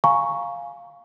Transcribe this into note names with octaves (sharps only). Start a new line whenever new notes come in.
F5 G#5 A#5 C#6